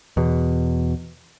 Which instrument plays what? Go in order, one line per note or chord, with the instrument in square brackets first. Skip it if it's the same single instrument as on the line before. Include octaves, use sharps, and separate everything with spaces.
[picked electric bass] E2 B2